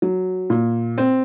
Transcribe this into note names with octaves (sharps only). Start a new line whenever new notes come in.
F#3
A#2
C4